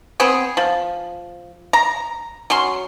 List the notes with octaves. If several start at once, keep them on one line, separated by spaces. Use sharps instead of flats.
B3 C4 G#4
F3
A#5
F#3 C#4 C6